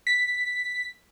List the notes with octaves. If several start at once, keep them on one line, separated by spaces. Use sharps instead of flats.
B6